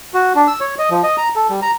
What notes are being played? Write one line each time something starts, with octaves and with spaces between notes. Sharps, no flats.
F#4
D4
E6
C#5
D#5
F3
D#5
A#5
A4
G3
A#5